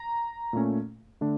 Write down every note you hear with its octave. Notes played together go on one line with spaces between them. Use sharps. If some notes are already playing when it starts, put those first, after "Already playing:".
Already playing: A#5
A#2 A3 C#4
D3 A3 D4